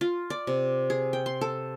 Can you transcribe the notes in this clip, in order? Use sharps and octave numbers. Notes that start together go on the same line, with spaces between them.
F4
D5
C3
G#4
G5
C6
A4